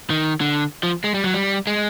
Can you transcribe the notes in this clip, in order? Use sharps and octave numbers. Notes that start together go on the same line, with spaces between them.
D#3
D3
F3
G#3
G3
F#3
G3
G#3